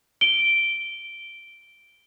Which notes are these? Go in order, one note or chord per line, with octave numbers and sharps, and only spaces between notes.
D7 G7